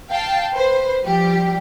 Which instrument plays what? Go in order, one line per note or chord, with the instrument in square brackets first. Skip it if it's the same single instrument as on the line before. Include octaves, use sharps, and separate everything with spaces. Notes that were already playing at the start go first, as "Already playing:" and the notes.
[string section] F5 G5 A5
B4 C5
F3 G3 G4